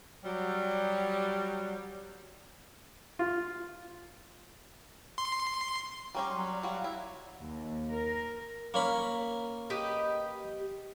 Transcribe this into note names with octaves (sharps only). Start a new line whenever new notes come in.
F#3 G3
F4
C6
G3 C#4 G4 A#5
F#3 C6
D5
G3 F#4 F5
E4
D#2
A#4
A#3 C#4 B5
G4 B4 D#5